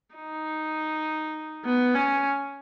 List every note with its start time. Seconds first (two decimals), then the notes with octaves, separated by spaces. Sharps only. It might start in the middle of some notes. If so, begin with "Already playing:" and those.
0.15 D#4
1.65 B3
1.95 C#4